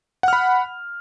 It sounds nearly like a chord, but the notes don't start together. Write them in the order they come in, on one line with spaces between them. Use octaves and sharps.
F#5 F6 B5